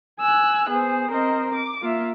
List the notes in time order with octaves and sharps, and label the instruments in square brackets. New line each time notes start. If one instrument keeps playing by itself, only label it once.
[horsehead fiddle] G#5 [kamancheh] E6 F#6
[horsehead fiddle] B3 C5 [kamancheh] G#4
[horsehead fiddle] C4 A#4 [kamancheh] C5 D#5
[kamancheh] D6
[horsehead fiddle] A#3 E5 [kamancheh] F4